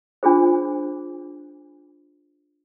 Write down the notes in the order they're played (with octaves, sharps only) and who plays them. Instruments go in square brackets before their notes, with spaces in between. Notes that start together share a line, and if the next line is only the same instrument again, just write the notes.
[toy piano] D4 F4 G#4 C5